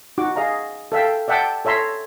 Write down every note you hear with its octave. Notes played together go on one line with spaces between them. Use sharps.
D#4 F#4 D6
G#4 D#5 F5 A#5
A4 E5 F5 G5
D5 E5 F#5 G5 A5 E6
A4 C#5 E5 A#5 C6